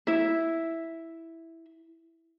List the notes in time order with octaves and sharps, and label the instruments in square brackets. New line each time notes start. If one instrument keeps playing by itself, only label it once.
[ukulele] E4 E5